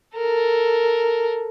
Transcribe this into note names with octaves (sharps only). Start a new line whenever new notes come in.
A4 A#4